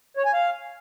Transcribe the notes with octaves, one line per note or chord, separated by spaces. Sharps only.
C#5
G#5
F5